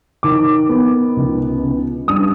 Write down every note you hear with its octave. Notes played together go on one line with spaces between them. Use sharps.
D#3 D6
B3
C#2
C#3
G2 D#6